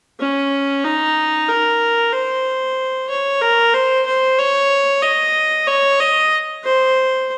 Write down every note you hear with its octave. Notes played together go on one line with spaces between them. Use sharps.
C#4
D#4
A#4
C5
C#5
A#4
C5
C5
C#5
D#5
C#5
D#5
C5